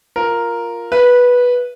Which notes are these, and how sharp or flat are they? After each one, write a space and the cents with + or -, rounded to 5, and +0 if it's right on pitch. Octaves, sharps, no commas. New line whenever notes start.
F4 +0 A#4 +0
B4 -10 E5 +10